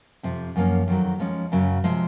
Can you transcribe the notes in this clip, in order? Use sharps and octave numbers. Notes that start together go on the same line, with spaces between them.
F2 C3 F3
F#2 F3 A#3 C#4
F2 D#3 F#3
F3 G#3 C#4
F#2 C#3 F#3 C#4
C3 F3 G#3